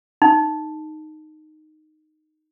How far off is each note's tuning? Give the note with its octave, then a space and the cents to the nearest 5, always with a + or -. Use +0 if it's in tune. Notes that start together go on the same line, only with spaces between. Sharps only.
D#4 -10